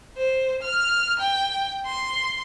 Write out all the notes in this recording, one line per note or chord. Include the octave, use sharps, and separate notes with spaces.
C5
F6
G5
C6